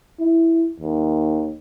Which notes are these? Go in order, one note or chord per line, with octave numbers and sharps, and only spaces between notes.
E4
D#2